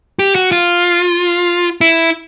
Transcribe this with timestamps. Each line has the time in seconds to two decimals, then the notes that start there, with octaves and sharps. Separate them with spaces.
0.19 G4
0.35 F#4
0.52 F4
1.81 E4